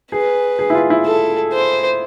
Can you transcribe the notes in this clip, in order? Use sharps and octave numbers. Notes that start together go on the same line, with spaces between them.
G#4 B4
G#4
E4
F4
E4
A4
C5